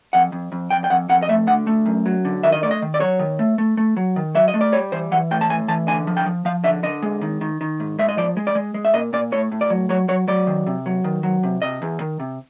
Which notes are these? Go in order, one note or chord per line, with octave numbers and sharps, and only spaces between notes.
F2 F#5
F2
F2
F2 G5
G5
F2 F#5
F2 F#5
D#5
A3 E5
D3 F#5
A3
F#2
F#3
D3
D#3 E5
D#5
A3 D5
D#5
D#3
D5
F#3 C#5
D#3
A3
A3
A3
F#3
D#3
F#3 E5
D#5
A3
D5
G3 C#5
E3 C5
E3 F#5
A2 G5
A5
A2 G#5
E3 A5
D3 G#5
F3
G5
F3
F3 F5
D3 E5
D3 D#5
G#3
D#3
D#3
D#3
G#2
G#3 E5
D#5
F3 D5
G#3
D5
G#3
G#3
E5
A#2 D#5
A#2 D5
A2 C#5
A2
D5
F#3
F#3 C#5
F#3 C#5
F#3 D5
D#3
C3
F#3
D#3
F#3
C3
C3 D#5
E2
D#3
C3